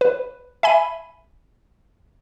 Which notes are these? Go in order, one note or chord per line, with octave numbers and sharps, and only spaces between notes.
B4
E5 G#5 B5 D#7